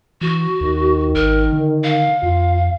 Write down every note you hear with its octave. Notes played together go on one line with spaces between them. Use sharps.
E3 F#4
D#2 D#3
G#1 A#4
D3
F5
F2 F4